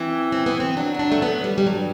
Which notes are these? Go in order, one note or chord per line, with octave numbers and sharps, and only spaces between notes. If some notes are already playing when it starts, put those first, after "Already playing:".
Already playing: E3 C4
C4
B3
C4
F#3 D4
C4
D4
A3
B3
G3
G3
G2 F#3